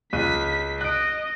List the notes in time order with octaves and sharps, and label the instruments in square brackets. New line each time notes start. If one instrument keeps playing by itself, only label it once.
[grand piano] C#2 F#6 D#7 [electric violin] B6
[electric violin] D#5 [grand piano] F#6 D7